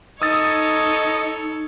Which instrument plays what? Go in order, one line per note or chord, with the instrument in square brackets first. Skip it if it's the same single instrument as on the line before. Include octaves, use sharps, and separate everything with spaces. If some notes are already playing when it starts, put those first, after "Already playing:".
[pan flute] D#4 [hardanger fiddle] A4 C#5 [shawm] D#5 [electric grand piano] D#6 E6 A6